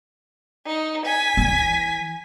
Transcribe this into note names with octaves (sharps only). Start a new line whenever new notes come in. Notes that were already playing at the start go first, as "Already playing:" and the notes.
D#4
G#5 B6
E3